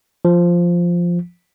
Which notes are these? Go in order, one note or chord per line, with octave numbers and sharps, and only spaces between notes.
F3